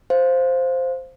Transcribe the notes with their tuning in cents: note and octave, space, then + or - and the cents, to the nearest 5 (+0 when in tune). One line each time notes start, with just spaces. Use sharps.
C5 +0 F5 +0